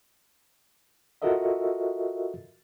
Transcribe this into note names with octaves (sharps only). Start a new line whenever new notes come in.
F4 F#4 A4 A#4 D#5 E5